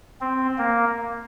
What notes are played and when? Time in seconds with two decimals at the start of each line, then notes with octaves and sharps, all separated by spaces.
0.21 C4
0.58 A#3